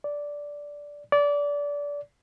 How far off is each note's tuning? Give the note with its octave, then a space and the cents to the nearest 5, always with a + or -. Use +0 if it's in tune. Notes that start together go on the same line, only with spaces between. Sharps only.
D5 -10
D5 -25